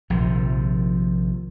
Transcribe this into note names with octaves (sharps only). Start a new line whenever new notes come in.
A#1 C3 D#3 F3